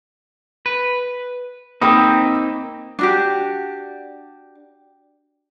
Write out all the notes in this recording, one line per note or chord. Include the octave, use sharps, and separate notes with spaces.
B4
A#3 C4 D#4 G5 B5 D#6
D4 F#4 G4